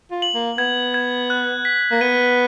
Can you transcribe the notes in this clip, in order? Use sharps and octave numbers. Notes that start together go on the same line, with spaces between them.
F4
F#7
A#3
B3 G#6
G#6
F#6
B6
A#3
B3 D#7